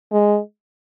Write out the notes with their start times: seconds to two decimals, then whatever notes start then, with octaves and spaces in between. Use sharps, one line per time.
0.12 G#3